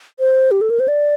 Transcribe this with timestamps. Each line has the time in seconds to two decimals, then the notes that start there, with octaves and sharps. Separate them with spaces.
0.20 C5
0.51 G4
0.61 A4
0.70 A#4
0.80 C5
0.88 D5